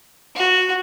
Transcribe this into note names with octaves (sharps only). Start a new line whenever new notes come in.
F#4